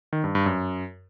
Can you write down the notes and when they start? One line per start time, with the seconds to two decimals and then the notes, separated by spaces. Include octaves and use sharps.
0.13 D#3
0.24 G2
0.35 G2
0.46 F#2